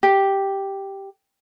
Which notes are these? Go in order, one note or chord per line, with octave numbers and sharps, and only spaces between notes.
G4